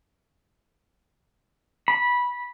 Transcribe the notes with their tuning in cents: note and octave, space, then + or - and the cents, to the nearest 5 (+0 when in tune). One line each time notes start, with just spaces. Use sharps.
B5 -15